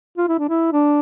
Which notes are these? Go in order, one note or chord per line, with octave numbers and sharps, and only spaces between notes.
F4
E4
D4
E4
D4